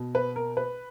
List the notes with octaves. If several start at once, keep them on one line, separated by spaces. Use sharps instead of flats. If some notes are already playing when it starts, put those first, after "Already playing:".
Already playing: B2
B4
A#4
B4